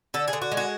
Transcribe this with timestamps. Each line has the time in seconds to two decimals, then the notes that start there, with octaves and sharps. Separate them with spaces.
0.14 D3 A4
0.28 G#4
0.33 D3
0.42 F#4
0.52 G#3
0.57 F#4